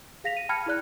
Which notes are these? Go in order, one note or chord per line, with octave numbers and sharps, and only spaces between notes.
G#4 F5 A#6 B6 F7
D#7
G5 A5 B5 F6 G#6 C#7
E4 G#4 D5 F#6